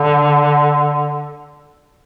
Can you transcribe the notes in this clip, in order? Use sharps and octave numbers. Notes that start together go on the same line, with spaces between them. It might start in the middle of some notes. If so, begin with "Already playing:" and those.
Already playing: D3